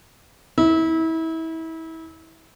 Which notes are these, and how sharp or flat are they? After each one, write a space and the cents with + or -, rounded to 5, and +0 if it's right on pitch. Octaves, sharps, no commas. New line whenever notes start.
E4 -30